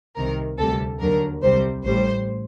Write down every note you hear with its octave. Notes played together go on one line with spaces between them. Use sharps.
C2 C3 D#3 A#4
D2 C3 G3 A4
D#2 D3 F#3 A#4
C2 C3 G3 C5
A1 A2 G3 C5